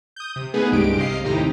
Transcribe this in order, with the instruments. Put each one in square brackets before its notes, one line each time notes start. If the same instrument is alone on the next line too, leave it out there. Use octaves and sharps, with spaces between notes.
[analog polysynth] D#6 G6
C3
A3 B3 D#4 G#4 B4
C2 G2 G#3 G4 D7
C3 D#5 F5 C7
D#2 A2 C3 D#4 G4 A#5